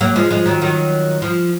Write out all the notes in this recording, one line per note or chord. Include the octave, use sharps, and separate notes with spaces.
F#3 A#3
F3 G#3
F3 G#3
D#3 F#3
D#3 F#3
F3